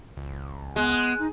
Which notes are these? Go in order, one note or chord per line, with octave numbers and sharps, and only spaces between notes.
C#2
G#3 B3 F#6
D#4